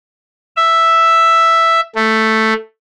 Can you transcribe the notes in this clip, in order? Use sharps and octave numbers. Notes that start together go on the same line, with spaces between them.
E5
A3